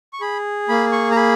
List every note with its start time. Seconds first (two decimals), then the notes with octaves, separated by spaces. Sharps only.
0.13 C#6
0.21 G#4 B5
0.69 A#3 B5
0.92 C#6
1.11 A#5
1.16 G#4 B5